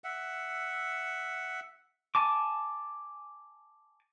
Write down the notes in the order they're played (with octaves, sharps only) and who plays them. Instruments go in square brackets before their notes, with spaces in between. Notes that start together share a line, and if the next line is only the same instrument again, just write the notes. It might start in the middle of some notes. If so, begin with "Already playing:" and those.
[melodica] E5 F#5
[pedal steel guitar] G#5 A5 D6